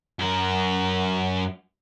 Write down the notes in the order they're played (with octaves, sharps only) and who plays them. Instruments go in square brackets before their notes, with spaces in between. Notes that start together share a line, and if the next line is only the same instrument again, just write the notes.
[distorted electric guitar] F#2 A#4